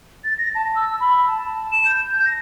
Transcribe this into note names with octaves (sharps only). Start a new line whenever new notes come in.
A6
A#6
A5
E6
B5
A5
E7
G6
A#6